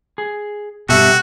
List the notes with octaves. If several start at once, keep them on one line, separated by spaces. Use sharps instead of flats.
G#4
G2 B2 F#4 G4 A4 E5